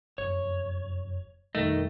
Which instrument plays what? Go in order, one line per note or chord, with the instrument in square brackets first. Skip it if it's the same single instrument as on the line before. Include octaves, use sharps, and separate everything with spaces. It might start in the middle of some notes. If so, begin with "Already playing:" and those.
[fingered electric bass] F1 F#2 [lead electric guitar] C#5
[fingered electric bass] F2 B2 G3 [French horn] D#3 [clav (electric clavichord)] A3 [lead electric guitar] D#5